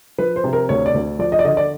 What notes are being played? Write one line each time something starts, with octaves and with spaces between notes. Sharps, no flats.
F3 B4
C5
C3
A#4
D2 C#5
D5
D2
F3 D5
D#5
D5
D3 D#5
D5